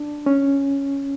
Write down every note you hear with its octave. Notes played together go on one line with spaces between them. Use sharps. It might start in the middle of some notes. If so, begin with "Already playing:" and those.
Already playing: D4
C#4